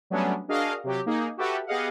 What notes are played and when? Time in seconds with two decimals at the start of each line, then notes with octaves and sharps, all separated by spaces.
0.10 F#3 G3 A3 B3 C#4 D4
0.48 D4 F#4 G#4 A#4 D#5 F5
0.84 C3 F#3 G4
1.06 A#3 D#4 G#4
1.37 F#4 G4 A4 B4 E5 F#5
1.67 B3 G4 G#4 D#5 F5 F#5